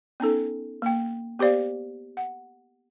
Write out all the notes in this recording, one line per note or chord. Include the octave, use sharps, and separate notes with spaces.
B3 C#4 D#4 A4
A#3 G5
B3 G4 C5 D5 F5
F#5